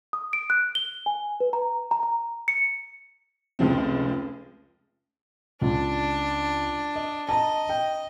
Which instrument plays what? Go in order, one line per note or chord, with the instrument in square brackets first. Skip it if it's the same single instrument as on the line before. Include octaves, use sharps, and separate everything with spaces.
[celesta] D#6
D7
F#6
G7
G#5
B4
A#5
A#5
A#5
C#7
[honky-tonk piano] F1 C#2 F3 C4
[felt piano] C#2 [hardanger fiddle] D4
[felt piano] D#5
[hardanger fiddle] D#5 [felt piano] A5 A#5
[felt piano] G5